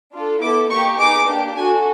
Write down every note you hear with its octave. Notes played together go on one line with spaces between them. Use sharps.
D4 F4 A4
B3 E4 A4 D6
A#3 D#4 G4 C#6
B3 D#4 G#4 D6
A#3 D4 G4
D4 F#4 A4 G#5